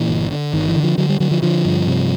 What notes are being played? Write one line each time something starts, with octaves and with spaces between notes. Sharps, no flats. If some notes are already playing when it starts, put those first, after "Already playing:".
Already playing: A#2 E3
G1
D3
G1 D#3
E3
D3
F3
D3 F#3
G3
D3 F#3
F3
D3 F3
G2
C3